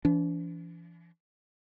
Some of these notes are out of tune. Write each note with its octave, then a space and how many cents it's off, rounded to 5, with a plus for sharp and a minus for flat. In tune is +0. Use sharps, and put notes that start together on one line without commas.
E3 +40 D4 -40